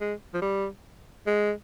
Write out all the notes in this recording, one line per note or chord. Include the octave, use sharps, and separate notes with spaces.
G#3
F3
G3
G#3